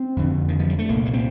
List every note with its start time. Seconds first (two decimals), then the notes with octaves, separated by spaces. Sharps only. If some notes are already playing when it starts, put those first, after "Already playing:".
Already playing: C4
0.16 F2 D3
0.48 D#3
0.59 F3
0.70 G3
0.79 A3
0.89 C2 A#2 A#3
1.06 A#3
1.13 C4